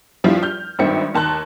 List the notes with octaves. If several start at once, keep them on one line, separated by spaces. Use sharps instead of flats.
G2 F3 G3 E4 F4
F6 G6
G#1 G2 D#3 C4 E5 C#7
D#2 A5 C6 F#6